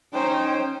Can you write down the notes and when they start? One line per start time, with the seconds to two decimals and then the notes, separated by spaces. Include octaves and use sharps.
0.14 C#4 D#4 C5 G5